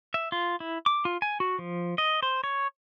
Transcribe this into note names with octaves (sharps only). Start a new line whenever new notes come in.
E5
F4
E4
D6
F4
G#5
F#4
F3
D#5
C5
C#5